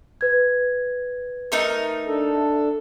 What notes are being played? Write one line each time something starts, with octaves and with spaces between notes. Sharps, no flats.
B4 G#6
A3 D#4 A#4
D4 A4